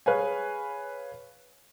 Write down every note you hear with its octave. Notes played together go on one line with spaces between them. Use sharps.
G#4 B4 C#5 F5 G#5